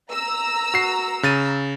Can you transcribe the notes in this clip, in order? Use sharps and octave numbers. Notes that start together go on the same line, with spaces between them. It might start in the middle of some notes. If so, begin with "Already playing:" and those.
A#5 E6
F#4 C7
C#3 A6 D#7